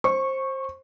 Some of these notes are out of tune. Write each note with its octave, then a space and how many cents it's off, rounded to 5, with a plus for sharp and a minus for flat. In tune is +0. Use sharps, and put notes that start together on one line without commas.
C5 +20 C#6 -10